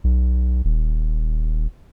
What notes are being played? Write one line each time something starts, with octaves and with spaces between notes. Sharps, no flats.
B1
D#1